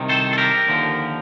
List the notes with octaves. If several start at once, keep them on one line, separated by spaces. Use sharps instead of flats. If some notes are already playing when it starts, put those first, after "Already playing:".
Already playing: C2 C3 D#3
A4 C5
A4
G4 A#4
D#2 D3 F3